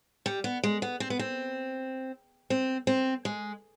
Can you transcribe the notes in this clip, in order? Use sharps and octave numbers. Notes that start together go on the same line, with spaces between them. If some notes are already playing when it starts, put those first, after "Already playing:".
G3
B3
G#3
B3
C4
B3
C4
C4
C4
G#3